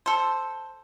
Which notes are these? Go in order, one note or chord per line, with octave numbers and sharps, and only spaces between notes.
A4 C5